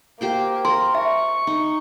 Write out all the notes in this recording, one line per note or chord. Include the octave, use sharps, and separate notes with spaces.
A#3 G4 C5 G5
A#4 C6
E5 C#6
D#4